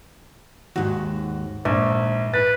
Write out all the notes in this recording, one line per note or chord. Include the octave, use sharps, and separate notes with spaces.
D#2 G#2 F#4
A#1 G#2
B4 A6